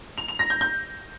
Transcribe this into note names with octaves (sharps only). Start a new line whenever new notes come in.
F7
F7
A#6
G6
G6